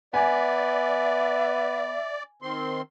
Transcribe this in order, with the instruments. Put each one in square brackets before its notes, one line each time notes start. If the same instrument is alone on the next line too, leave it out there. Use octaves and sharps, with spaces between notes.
[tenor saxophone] B3 [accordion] D5 [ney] E5 [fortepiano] G#5
[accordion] D#3 C4 C6